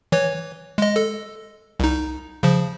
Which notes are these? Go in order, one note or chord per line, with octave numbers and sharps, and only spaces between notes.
E3 C#5
G#3 D#5
A4
C2 D#4
C#3 F3